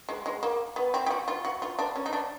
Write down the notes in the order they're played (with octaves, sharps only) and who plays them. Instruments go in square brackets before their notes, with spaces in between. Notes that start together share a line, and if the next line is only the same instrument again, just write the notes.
[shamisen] G#3
G#3
A#3
B3
C4
G4
F#4
F4
F#4
F4
D4
C#4
D#4
D4